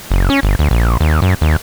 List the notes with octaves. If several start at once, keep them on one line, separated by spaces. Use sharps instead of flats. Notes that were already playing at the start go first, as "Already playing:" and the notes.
F#1
C#4
G1
D2
A#1
D#2
F#2
D#2